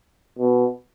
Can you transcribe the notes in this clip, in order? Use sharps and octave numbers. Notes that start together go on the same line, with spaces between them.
B2